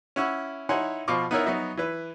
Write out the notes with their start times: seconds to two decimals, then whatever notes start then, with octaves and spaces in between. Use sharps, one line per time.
0.16 C#4 E4 F#5 C#6 E6
0.69 D#4 E4 C#5 F#5 G#5 C6
1.08 B2 F3 F4 C#6 D6
1.31 B3 D#4 E4 A#4 C#5 E5
1.46 F#3 B3 D#4 E5
1.77 E3 B4